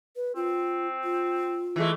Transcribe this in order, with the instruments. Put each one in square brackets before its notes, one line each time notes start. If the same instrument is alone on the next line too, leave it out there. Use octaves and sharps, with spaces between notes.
[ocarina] B4
[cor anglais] C4 [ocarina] F4
[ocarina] F4
[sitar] E3 G#3 A3